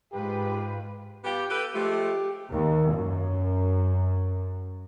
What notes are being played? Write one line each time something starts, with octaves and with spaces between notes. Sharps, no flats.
G#2 F4 G4 B4
B3 F4 G4
G4 A4 B4
F3 G#3 A3 G4
D#2
F#2